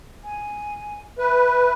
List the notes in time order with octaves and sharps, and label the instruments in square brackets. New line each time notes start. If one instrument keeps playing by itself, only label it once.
[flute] G#5
[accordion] B4 [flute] E5